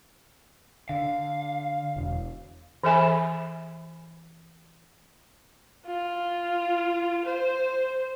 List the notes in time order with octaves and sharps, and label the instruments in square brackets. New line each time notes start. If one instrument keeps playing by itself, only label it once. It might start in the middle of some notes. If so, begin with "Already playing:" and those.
[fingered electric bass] D3 [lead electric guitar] F5
[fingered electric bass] E1
[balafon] E3 G#4 A4 E5 G#5 B5
[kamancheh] F4
C5